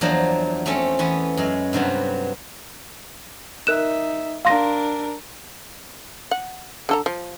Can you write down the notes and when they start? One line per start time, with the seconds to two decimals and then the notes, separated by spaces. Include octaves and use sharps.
0.01 E2 F3 F#3 A#3 D4 A#4
0.66 A3 C4 C#4 A4
0.99 E3 B3 C#4
1.37 F#2 G#3
1.73 G2 C3 F#3 B3
3.67 D#4 A#4 E5 F#6 E7
4.45 D4 A#4 F5 C6 A#6
6.31 F#5
6.89 D3 A4 A#5
7.06 F3